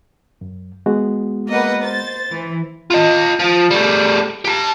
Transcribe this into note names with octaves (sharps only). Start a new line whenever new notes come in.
F#2
G#3 B3 F#4
A#3 B4 D#5 F#5
C5 A6
E3
F4 D#5
F3
G3 A3
G4 A5